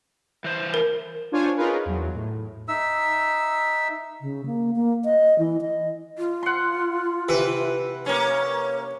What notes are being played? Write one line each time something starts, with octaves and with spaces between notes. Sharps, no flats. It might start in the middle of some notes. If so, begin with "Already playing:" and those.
E3 C5
A#4
D4 F4 C5 C#5 G#5
C#4 D#4 F4 G#4 A#4 B4
E2 F#3
A2
D#4 E5 E6
C#3
A#3
A#3
D#5
E3
D#5
F4
F#5 C6
C3 E3 B4 E5
A#3 C#4 C#5